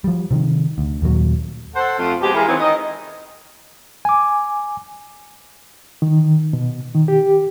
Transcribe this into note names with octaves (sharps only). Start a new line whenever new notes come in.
F3 G3
C3 D#3
D2
D#2 A#2 F#3
A4 C5 F#5
F2 F3 A3 C4 F4
B2 G#3 C4 G4
E3 G#3 E4 F4 G#4 A#4
D#3 E3 F#3 B3 C4
D#3 D#5
G#5 D6
D#3
B2
D#3
G4